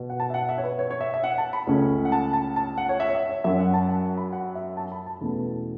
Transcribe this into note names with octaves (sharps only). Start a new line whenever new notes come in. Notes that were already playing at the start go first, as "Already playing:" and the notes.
Already playing: B2 B3
F#5
A5
E5
F#5
E5
C#5
B4
C#5
C#5
E5
E5
F#5
A5
B5
C#2 C#3 A3 C#4
F#5
A5
A5
A5
F#5
C#5
E5
C#5
E5
C#5
F#2 F#3 C#4 E5
F#5
F#5
A5
F#5
B5
F#5
E5
A5
B5
A5
E2 B2 A3 C#4